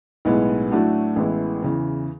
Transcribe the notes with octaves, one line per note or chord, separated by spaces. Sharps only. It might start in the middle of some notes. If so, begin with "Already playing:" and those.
B1 A2 G#3 B3
A2 F#3 A3 D4 F#4
A1 A2 G#3 B3 E4
E2 C#3 E3